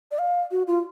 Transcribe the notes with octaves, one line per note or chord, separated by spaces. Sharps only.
D5
F5
F#4
F4